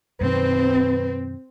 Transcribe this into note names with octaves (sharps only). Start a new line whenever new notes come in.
F#2 B2 D#3 C4 B4